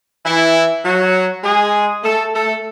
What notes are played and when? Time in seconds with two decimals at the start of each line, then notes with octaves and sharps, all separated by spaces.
0.25 E3 E4
0.84 F#3 F#4
1.44 G#3 G#4
2.04 A3 A4
2.34 A3 A4